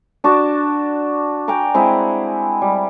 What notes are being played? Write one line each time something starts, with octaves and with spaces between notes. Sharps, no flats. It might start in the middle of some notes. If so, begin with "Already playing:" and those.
D4 F#4 A5
G5 G#5 A#5 D6
G#3 C4 E4 F#5
G3